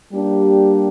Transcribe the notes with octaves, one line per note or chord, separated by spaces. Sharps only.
G3 A#3 D4 G4